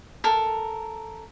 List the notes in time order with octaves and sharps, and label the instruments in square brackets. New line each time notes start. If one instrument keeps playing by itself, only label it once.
[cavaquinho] A4 A#4